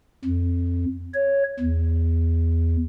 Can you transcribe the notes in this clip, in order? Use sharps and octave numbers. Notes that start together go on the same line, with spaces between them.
F2
C#5
E2